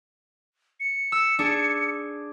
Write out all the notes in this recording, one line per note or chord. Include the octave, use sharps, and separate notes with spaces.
C#7
E6
D4 G#4